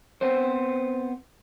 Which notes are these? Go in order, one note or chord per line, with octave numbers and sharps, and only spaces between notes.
B3 C4 C5